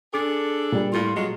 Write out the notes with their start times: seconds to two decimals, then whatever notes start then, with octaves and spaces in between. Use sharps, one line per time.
0.14 D4 G#4 A4 D6
0.72 A#2 G3
0.93 A2 F4
1.17 F#3 G#3 F4